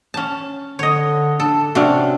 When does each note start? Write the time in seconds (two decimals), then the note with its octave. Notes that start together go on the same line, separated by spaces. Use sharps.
0.14 C#4 A5
0.79 D3 C#5 D#5
1.40 D4 A4
1.75 C3 C#4 D4 F#4